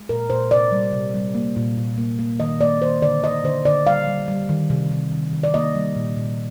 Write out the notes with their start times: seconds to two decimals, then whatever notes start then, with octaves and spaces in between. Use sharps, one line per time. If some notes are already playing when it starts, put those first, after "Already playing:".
Already playing: G#3
0.09 A#2 A#4
0.30 A#2 C5
0.51 C3 D5
0.72 G3
0.93 C3
1.14 G3
1.35 A#3
1.56 A#2
1.77 A#2
1.98 A#3
2.19 A#3
2.40 D#3 D#5
2.60 A#3 D5
2.81 D#3 C5
3.02 D3 D5
3.23 D3 D#5
3.44 D3 C5
3.65 D3 D5
3.86 G3 F5
4.07 G3
4.28 G3
4.49 D#3
4.70 C3
4.91 C3
5.12 D#3
5.33 D#3
5.43 D5
5.54 A#3 D#5
5.75 G3
5.96 A#2
6.17 A#2